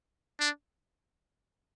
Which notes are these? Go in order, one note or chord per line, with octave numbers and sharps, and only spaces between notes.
D4